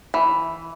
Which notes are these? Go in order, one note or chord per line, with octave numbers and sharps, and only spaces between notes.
E3